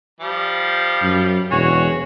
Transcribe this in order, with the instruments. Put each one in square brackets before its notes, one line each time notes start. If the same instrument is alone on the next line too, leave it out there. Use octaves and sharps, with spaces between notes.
[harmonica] F3 G3
[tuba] F#2
[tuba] E1 [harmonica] F#4 G#4 C#5